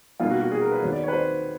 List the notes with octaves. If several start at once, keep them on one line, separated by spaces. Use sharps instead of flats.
B1 B2 G3 A#3 F4
F#4
F#4
G#4
A#4
B4
D#2 D#3 F#3 B3
D5
B4 C#5
C5